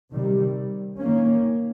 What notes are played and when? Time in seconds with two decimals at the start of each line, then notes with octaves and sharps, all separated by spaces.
0.11 C3 D#3 G3
0.98 D#3 A#3 C#4